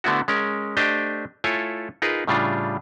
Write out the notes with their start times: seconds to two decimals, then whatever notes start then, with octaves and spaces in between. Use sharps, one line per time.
0.04 D3 A3 B3 E4 F#4
0.28 G#3 C#4 A#4
0.77 A3 D4 G4 C5 D#5 G5
1.44 A3 E4 F4 A4 C#5 G#5
2.02 D#4 F4 G#4 A#4 B4
2.27 A2 C#3 G3 D4 F4